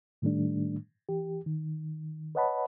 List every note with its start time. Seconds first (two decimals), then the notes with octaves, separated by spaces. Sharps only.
0.22 A2 D#3 G3 A3 D4
1.09 E3 G4
1.47 D#3
2.35 B4 C#5 D#5 F#5 A5 B5